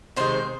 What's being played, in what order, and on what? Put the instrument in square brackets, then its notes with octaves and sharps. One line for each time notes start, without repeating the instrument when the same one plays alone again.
[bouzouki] C3 D#3 G#3 C5